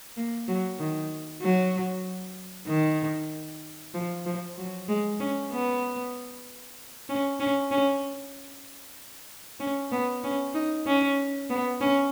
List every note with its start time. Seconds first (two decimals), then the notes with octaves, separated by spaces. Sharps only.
0.17 A#3
0.48 F#3
0.80 D#3
1.42 F#3
2.68 D#3
3.94 F3
4.26 F3
4.58 F#3
4.88 G#3
5.20 C#4
5.52 B3
7.09 C#4
7.40 C#4
7.71 C#4
9.60 C#4
9.92 B3
10.24 C#4
10.54 D#4
10.87 C#4
11.50 B3
11.81 C#4